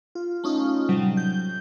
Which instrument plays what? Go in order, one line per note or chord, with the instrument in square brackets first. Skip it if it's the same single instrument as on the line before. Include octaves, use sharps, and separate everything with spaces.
[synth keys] F4
A3 C#4 D#4 F4
A2 C3 F#3 G3
G6